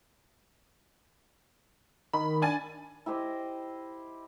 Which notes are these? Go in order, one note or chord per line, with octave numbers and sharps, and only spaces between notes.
D#3 B5
D4 G#5 A6
E4 G4 C5 D#5